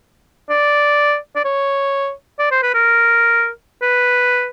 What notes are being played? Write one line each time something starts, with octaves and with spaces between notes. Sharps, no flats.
D5
D5
C#5
D5
C5
B4
A#4
B4